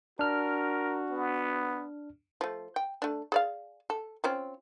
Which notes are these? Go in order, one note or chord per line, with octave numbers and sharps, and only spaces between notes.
D4 F#4 A#4 F6
B3
F3 A3
G5
A3 D4
G#4 D5 F5
A4
C4 C#4 F4